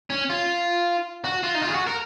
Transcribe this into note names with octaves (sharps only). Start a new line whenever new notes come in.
C#4
F4
F#4
F4
D#4
F4
G#4
F#4
A#4